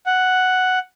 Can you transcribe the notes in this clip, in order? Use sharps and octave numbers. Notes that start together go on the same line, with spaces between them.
F#5